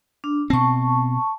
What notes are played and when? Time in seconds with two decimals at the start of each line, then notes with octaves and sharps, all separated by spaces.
0.24 D4
0.50 B2 C4 A5 C#6